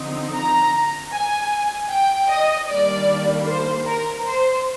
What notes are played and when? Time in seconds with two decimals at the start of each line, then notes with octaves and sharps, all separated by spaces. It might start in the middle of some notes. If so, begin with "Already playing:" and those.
Already playing: D3 F3 C4 D#4
0.35 A#5
1.13 G#5
1.91 G5
2.31 D#5
2.69 D#3 G3 A#3 D4 D5
3.48 C5
3.87 A#4
4.26 C5